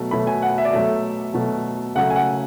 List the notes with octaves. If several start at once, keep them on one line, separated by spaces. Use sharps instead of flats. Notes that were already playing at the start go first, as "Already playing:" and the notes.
Already playing: B2 F#3 A3
B2 F#3 A3 B5
G#5
F#5
E5
D5
B2 F#3 A3 E5
B2 F#3 A3
C#3 F#3 A3 F#5
G#5
F#5